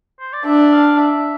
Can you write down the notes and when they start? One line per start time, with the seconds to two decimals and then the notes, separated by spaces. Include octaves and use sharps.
0.20 C5
0.33 D5
0.45 D4 E5
0.73 F5
0.98 E5